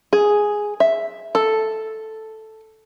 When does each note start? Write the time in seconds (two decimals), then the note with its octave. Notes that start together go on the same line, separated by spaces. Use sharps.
0.13 G#4
0.80 E5
1.35 A4